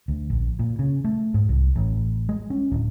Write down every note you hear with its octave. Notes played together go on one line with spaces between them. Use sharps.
D2
A#1
A#2
C#3
A3
G#2
C2
A1
G#3
C#4
D1